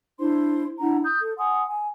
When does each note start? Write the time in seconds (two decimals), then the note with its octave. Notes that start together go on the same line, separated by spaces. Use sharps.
0.19 D4 E4 C5 C6
0.80 D4 E4 F#5 A#5
1.04 D#6 G6
1.22 A4
1.38 F#5 G#5 C6 D#6
1.66 G#5